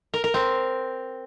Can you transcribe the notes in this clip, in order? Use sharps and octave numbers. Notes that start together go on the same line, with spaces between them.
A#4
A#4
C4